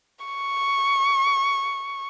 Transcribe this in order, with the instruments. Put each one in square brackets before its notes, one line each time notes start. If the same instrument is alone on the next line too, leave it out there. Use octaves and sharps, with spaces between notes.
[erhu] C#6